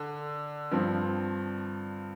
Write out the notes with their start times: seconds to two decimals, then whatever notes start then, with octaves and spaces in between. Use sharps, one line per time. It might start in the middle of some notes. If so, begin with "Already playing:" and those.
Already playing: D3
0.72 G2 F3 C4